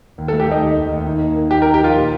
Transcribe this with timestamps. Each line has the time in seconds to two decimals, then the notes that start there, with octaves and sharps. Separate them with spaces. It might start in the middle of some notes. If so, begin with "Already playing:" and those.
0.18 D#2
0.28 A4
0.33 A3
0.40 G4
0.48 A3 D#4
0.62 D#2
0.77 D#2
0.92 D#2
1.06 D#4
1.21 A#3
1.36 A#3
1.51 D#4 G4
1.62 A#4
1.66 D#4
1.74 G4
1.81 F3 F4
1.95 A#2